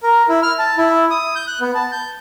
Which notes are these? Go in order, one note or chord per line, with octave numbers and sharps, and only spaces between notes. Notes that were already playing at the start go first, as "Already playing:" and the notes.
A#4
E4
F6
A5
E4
D#6
G6
F#6
B3
A5
G6